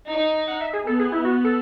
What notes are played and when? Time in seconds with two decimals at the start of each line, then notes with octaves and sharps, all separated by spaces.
0.10 D#4
0.47 F#5
0.61 E5
0.73 G#4
0.87 B3 A4
0.99 G#4
1.12 E4
1.25 F#4
1.44 A4